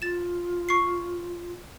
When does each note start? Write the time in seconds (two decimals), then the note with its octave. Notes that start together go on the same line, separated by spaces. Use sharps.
0.02 F4 A6 E7
0.69 C#6 C7